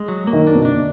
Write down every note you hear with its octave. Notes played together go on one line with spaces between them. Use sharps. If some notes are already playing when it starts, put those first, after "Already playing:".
Already playing: G#3
F#3
A#3
D#3
D4
B2
D3
D4